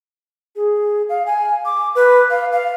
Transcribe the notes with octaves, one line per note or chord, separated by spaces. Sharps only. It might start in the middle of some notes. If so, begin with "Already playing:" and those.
G#4
F5
G#5
D6
B4
F5
F5